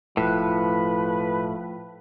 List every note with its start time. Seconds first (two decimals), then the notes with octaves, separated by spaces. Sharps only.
0.17 E1 A2 F3 B4